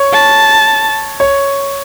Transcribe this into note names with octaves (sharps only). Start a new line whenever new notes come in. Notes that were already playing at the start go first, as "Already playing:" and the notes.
Already playing: C#5
A5
C#5